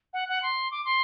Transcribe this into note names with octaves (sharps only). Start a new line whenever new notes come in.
F#5
F#5
C6
D6
C6